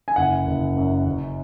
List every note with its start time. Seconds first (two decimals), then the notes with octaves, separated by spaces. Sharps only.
0.08 G#5
0.16 F#1 F#5
0.47 F#1
0.77 F#2
1.06 F#1